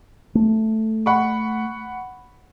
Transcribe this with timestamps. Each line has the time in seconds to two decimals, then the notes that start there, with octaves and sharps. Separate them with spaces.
0.35 A3
1.06 F#5 B5 C#6